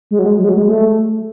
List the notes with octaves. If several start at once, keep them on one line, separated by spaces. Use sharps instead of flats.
G#3
F#3
G#3
F#3
G#3
F#3
G#3
A3